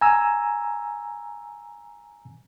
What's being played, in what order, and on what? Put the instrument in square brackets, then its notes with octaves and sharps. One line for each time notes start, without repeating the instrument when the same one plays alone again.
[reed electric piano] G#5 A#5 E6